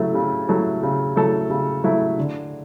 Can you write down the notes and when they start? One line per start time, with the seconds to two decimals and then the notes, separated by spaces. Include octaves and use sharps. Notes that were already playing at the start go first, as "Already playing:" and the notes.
Already playing: C#3 F#3 A3 E4 A4
0.14 C#3
0.48 F#3 A3 E4 A4
0.83 C#3
1.16 F#3 A3 E4 A4
1.50 C#3
1.84 F#3 A3 E4 A4
2.18 D3